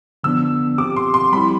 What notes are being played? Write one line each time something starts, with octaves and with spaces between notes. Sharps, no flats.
D3 F3 B3 D4 E6
F3 C4 G4 D6
C6
C6
G3 C4 E4 G4 B5